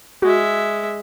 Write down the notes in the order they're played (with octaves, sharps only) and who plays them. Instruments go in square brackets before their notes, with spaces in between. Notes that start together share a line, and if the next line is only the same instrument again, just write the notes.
[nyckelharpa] G#3 E5 [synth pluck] F#4